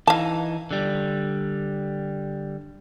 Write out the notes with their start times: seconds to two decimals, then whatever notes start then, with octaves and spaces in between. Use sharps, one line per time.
0.07 E3 D#4 F5 A5
0.71 D3 G3